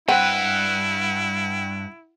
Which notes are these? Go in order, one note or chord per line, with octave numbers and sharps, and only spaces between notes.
G2 C4 E4 B4 F#5